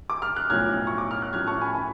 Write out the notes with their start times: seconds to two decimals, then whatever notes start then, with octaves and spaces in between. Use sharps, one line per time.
0.10 D6
0.22 F6
0.36 F#6
0.50 B1 A2 F3 F6 G#6
0.87 C#6
0.98 D6
1.11 F6
1.22 F#6
1.33 A1 A2 F3 F6 G#6
1.47 A5 C#6
1.61 G#5 B5
1.74 G#5 B5